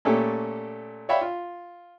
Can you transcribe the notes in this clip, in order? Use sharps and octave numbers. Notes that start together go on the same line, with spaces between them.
A#2 A3 C#4 G4 A4
C#5 D5 E5 F5 G5 B5
F4